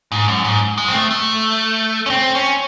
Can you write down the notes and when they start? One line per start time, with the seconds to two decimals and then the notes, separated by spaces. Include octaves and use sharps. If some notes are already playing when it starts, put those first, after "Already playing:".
0.12 G#2
0.28 F#2
0.44 G#2
0.78 G#3
0.88 C4
0.94 A3
1.11 A3
2.06 C#4
2.10 C4
2.35 C#4